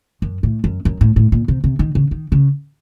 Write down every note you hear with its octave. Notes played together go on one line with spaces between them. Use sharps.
F#2
A2
F#2
F#2
A2
A2
A#2
C3
C3
D#3
C#3
D#3
C#3